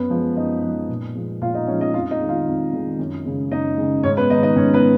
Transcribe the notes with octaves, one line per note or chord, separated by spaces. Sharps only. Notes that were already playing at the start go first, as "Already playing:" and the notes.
Already playing: F#2 B3 B4
F3 G#3
F#2 D#4 D#5
F3 G#3
A#2
F3 G#3
A#2 F4 F5
D#4 D#5
F3 G#3 C#4 C#5
D#4 D#5
F2 F4 F5
D#4 D#5
D#3 G#3
F4 F5
F2
D#3 G#3
F#2
C#3 G#3
F#2 D#4 D#5
C#3 G#3
G#2 C#4 C#5
B3 B4
D#3 G#3 D#4 D#5
D#4 D#5
G#2 C#4 C#5
B3 B4